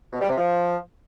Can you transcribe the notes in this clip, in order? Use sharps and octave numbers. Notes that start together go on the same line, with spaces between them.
B2
G3
C3
F3